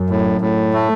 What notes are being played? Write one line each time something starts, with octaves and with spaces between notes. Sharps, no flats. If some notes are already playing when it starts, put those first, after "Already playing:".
Already playing: F#2
A2
A2
A3